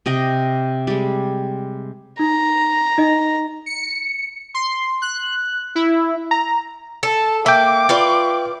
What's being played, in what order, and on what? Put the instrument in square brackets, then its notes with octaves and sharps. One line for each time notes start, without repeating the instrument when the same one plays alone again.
[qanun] C3 D#5 G5
G3 G#3
[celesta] D#4 [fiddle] A#5
[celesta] D#4 D#5
[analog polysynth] C#7
C6
F#6
E4
[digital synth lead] A#5
[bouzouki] A4 [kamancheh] A5
[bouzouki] A#3 [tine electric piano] E5 G5 [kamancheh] D6
[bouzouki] F4 B4 D5